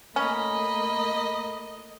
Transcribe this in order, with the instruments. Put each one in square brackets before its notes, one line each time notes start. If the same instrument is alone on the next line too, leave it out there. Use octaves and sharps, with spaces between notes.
[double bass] A3 A#3 [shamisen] C#4 [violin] D#5 [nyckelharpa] B5